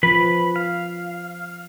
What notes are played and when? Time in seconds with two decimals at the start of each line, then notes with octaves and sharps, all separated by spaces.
0.03 F3 B4 B5
0.56 F5